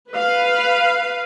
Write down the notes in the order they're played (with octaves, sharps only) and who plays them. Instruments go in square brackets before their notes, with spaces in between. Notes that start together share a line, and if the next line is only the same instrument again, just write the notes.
[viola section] B4 F5